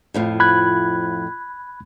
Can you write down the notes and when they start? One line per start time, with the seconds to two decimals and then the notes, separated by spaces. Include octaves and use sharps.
0.14 F2 A2 F3
0.40 B5 F#6 G#6